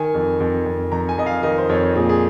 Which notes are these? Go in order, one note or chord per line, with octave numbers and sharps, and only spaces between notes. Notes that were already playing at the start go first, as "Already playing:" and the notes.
Already playing: D#3 G#5
F2
F2
F2
F2 A#5
G#5
F2 D#5
F5
D#3 D#5
C5
F2 C#5
A#2 G#4
G#4